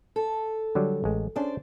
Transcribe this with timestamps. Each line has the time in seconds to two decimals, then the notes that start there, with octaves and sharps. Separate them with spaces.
0.16 A4
0.75 D3 F#3 G3
1.04 A1 G#3
1.36 C#4 D4 G#4 C5 D5